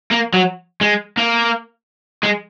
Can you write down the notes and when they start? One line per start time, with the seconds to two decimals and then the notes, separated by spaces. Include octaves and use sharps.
0.11 A#3
0.34 F#3
0.81 G#3
1.17 A#3
2.23 G#3